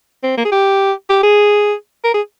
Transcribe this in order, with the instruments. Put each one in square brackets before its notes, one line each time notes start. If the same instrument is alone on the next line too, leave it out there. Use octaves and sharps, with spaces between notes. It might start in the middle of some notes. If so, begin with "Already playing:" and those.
[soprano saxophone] C4
A#3
G#4
G4
G4
G#4
A#4
G#4